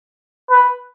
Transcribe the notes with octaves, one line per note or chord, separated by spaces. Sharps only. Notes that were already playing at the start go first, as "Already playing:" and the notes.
B4